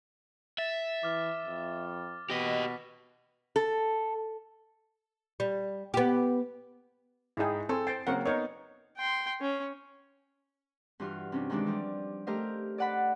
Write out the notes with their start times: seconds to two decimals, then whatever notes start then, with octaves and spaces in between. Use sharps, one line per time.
0.58 E5 A6
1.03 E3 D6 F6
1.46 F2
2.30 B2 G4 D#5 A#6 B6
3.56 A4
5.40 G3
5.94 B3 G4
7.37 G#2 D#4 E4 G#4 G5
7.69 C4 A4 G#5 C6
7.87 C5 G5 A6 C7
8.07 C#3 F#3 A#3 C4 A#4 F#5
8.26 B3 D#4 A#4 B4 C#5
8.97 G5 C6
9.41 C#4
11.00 G2 E3 F4 F#4 F5
11.32 C3 C#4 D4
11.50 D#3 E3 G#3 D4 D5
11.65 F3 G3 D6
12.27 A3 G4 A#4 C5 D#5 F5
12.78 D5 D#5 F#5 A5 B5